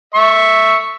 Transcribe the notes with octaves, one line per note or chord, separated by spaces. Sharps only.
E5 C#6